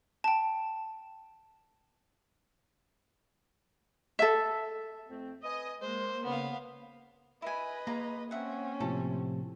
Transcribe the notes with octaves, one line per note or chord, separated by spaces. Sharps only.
G5 A5
A4 E5
F2 A3 C4
B4 D#5 G#5 D#6
G#3 A#3 C5
C#3 B3 F5
E4 B4 D#5 G#5
A#3 F4 G#4 A#5
C4 C#4 E5 F#5
A2 C3 F3 A4